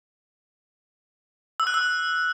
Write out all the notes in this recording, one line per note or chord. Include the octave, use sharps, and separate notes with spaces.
E6
F#6
E6